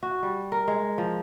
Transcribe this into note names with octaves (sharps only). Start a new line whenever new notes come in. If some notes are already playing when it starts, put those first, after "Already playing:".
F#4
G3
A#4
G#3
F3